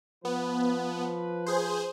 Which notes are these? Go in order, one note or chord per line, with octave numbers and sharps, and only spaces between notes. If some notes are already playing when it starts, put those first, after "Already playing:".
F3 B3 B4
G#4 C5